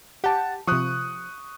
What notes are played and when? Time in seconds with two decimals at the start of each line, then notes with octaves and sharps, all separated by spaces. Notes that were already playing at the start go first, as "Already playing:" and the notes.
0.24 G4 F#5 A5
0.67 C3 F3 C#6 D#6 F#6